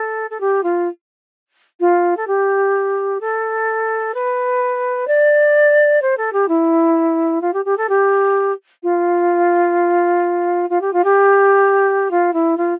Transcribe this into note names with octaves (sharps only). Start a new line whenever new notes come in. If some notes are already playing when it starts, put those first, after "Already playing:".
Already playing: A4
A4
G4
F4
F4
A4
G4
A4
B4
D5
C5
A4
G4
E4
F4
G4
G4
A4
G4
F4
F4
G4
F4
G4
F4
E4
F4